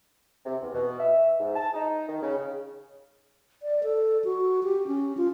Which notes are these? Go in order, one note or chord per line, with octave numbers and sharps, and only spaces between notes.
C3
E2
B2
E5
G#2
A5
D#4
D#3
C#3
D5
A4
F#4
G4
C#4
F4